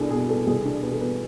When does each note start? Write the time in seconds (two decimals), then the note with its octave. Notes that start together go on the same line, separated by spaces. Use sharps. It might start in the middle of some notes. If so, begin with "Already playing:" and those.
Already playing: C2 B3 D4 G#4 A4
0.10 B2 G#4
0.29 B3 A4
0.47 C2 G#4
0.65 D4
0.83 B2 B4
0.93 A4
1.01 B3 B4